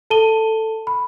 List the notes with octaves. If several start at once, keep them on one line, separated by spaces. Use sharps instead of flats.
A4 A5 D#7 G7
B5